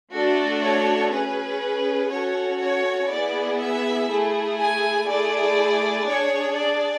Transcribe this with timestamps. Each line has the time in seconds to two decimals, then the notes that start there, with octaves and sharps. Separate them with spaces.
0.13 A3 D4 F#4 A4
0.63 C#5
1.11 C#4 G#4 B4
2.11 C#4 F#4 A4 C#5
2.60 C#5
3.10 B3 E4 G#4 D5
3.59 E5
4.09 A3 E4 G#4
4.59 G#5
5.08 A3 E4 G#4 D5
6.07 D4 G#4 C#5
6.57 D5